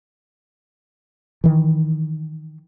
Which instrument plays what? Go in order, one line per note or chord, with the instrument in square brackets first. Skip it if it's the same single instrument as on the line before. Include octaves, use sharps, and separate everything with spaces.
[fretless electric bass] D#3 E3